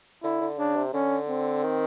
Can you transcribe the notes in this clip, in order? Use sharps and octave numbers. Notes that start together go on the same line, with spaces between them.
D3 E4
D3
C#3 D4
C3
D3 C#4
C4
D#3